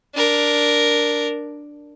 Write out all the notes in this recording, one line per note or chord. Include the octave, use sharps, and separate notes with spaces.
D4 A#4